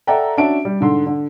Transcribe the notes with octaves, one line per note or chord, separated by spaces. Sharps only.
A4 D5 E5 F#5 G5 A#5
C#4 D4 F#4 E5 A5 D7
G3
G#2 D3 C6
D3